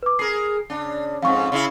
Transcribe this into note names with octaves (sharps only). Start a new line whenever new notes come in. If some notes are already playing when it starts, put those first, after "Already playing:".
B4 D6
G#4 A#4 C7
C#3 D4
F2 G#2 F5 C#6
C#3 D4 E4